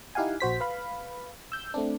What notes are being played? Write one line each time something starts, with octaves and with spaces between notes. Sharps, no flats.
D#4 E4 G4 F5 F#5 G#5
A#1 F#4 C5 B6
B4 F5 B5
E6 G6
A3 C4 D4